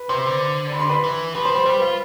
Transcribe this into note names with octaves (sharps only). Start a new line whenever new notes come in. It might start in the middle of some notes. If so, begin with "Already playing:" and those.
Already playing: B4
C3 C5 C6
D3
B5
C6
B4 B5
E3
F3 B4 B5
C5 C6
G3
C5 C6
G3 B4 B5
F4